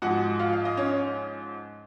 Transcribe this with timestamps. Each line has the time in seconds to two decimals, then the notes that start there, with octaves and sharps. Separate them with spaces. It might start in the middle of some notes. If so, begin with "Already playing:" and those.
0.02 G#2 F3 G#3 F#4 F#5
0.39 F4 F5
0.53 F5
0.65 D#5
0.77 C#4 C#5